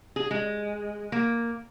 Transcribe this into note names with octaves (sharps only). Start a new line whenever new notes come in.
G#4
G#3
A#3